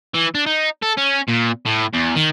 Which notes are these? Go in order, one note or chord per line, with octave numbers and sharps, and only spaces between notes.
E3
D4
D#4
A4
C#4
A#2
A2
E2
D#3